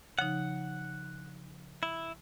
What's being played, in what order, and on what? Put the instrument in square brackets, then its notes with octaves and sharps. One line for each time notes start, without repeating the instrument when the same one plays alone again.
[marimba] C#3 F3 D#4 [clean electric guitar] F#5
[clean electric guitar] E4